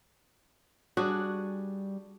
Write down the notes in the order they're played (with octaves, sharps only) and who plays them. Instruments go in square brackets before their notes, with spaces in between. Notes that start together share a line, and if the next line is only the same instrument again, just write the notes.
[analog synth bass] G3 [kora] D4 F#4 G#4